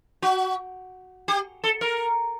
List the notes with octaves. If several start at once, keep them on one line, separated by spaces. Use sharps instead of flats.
F#4
G4
A4
A#4